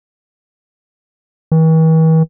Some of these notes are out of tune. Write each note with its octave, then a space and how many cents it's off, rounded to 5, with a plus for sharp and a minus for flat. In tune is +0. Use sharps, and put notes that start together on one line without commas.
E3 -45